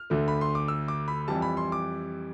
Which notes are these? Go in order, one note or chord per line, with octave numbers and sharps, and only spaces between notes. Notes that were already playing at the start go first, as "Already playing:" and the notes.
Already playing: F6
D2 D3 A3
B5
C6
D6
E6
D6
B5
F2 E3 G3 A5
B5
C6
D6